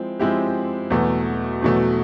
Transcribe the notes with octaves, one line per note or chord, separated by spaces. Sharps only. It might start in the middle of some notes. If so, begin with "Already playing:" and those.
Already playing: F3 G#3 C4 E4
F3 G#3 C4 E4 G4
E2 B2 F#3 A3
E2 B2 F#3 A3